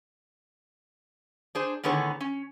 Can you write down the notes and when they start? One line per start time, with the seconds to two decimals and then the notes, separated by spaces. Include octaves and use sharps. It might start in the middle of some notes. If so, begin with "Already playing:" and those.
1.55 D4 G#4 C5
1.83 A2 D3 D#3 B3 G#4 C#5
2.21 C#4